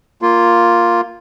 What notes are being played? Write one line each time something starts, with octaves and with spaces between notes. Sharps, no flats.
A#3 F4